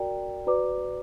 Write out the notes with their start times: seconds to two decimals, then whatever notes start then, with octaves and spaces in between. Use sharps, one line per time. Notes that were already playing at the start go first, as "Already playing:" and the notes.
Already playing: F#4 A#4 D5 G5 A#5
0.47 F#4 B4 D5 A#5 D6